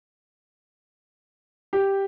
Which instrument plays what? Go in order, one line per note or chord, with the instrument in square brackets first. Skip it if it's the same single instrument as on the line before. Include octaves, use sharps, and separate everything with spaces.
[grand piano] G4